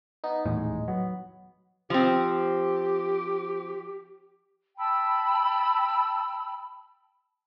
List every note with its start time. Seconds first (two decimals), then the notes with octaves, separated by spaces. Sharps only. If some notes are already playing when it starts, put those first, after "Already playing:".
0.24 B3 D#4
0.46 D#1 E2 A2 G#3
0.88 F#3 B3
1.90 F3 C4 G4
4.78 G5 A5 B5 E6